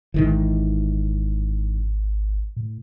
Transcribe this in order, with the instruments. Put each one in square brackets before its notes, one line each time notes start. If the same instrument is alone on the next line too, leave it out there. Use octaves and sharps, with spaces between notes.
[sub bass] G#1 [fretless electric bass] G#2 D#3 E3
[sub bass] A2